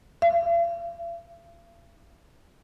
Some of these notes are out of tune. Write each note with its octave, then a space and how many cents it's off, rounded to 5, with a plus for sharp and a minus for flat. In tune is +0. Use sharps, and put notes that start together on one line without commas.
F5 -45